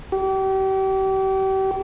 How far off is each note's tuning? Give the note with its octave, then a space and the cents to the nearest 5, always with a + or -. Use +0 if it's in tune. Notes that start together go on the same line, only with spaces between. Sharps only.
G4 -35